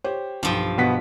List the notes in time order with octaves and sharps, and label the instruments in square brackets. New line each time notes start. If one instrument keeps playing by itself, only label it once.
[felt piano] G4 C5 C#5
[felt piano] B1 [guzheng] G2 F3 G5
[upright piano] B2 B3 B6